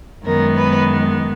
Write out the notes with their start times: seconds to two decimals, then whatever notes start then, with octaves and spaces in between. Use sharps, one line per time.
0.24 F#2 D#3 G#3 B3 A#4
0.55 B4